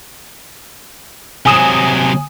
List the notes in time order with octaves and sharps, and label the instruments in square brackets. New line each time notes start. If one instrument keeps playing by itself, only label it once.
[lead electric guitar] C3 F#3 [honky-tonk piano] G#5 D#6 E7